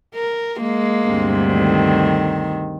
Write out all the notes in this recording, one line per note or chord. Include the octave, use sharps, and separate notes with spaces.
A#4
G#3 A#3
D2 G2 C3
D#3